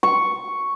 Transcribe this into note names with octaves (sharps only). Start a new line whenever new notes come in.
C#6